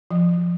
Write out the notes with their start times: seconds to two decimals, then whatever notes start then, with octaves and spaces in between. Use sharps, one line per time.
0.11 F3